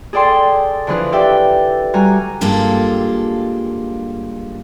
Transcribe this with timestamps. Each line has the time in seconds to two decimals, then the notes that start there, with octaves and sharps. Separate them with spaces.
0.13 G#4 A4 D5 G5 C6
0.87 D3 E3 F3 G#4 B4
1.12 G4 D5 E5 G5
1.94 G3 F#4 G#5 A#5
2.41 G2 G#3 A#3 F4 G4 A4